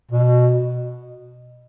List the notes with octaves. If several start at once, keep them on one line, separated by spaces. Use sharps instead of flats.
B2